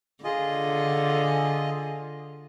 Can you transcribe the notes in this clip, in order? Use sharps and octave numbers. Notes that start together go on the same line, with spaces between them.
D3 F4 G#4 D#5